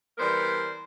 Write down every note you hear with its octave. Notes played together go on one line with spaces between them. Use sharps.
E3 G3 B3 A#4 C5